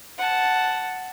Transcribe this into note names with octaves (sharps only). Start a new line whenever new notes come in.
F#5 A5